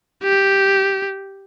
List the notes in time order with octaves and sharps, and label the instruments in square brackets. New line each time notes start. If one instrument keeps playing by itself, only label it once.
[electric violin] G4